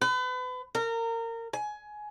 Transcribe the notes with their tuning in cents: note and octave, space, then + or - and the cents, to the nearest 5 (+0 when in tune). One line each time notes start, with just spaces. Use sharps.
B4 +35
A#4 -25
G#5 +20